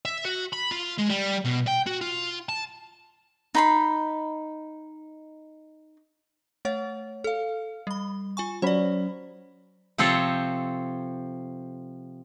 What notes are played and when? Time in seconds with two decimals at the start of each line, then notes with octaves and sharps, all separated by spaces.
0.05 E5
0.25 F#4
0.53 B5
0.71 F4
0.98 G#3
1.09 G3
1.45 B2
1.67 G5
1.87 F#4
2.01 F4
2.49 A5
3.55 D#4 B5 C6
6.65 A3 C#5 F#5
7.24 A4 F5
7.87 G3 B5
8.37 F4 G#5 C#6
8.62 F#3 C#4 C5 D5 B5
9.98 C3 F3 C4 A4 C5 C#5